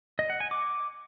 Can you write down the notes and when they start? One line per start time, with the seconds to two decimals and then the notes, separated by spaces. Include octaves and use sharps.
0.19 D#5
0.30 F#5
0.40 G#5
0.51 D6